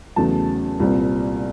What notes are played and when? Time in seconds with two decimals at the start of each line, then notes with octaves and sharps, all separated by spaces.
0.16 E2 C#3 F#3 A3 A5
0.80 C2 A#2 G3 C4